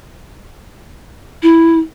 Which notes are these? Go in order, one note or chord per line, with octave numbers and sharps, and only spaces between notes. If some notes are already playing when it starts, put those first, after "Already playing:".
E4